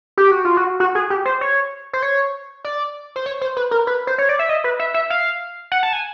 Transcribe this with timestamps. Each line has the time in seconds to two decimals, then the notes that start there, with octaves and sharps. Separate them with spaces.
0.18 G4
0.31 F#4
0.45 F4
0.57 F#4
0.80 F#4
0.95 G#4
1.10 G4
1.25 C5
1.41 C#5
1.93 C5
2.02 C#5
2.64 D5
3.16 C5
3.26 C#5
3.41 C5
3.57 B4
3.71 A#4
3.87 B4
4.07 C5
4.18 C#5
4.29 D5
4.39 E5
4.49 D#5
4.64 B4
4.79 E5
4.94 E5
5.10 F5
5.72 F#5
5.83 A5
5.93 G#5